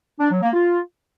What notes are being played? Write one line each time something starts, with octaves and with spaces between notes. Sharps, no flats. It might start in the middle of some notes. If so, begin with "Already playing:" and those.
D4
F#3
A#3
F4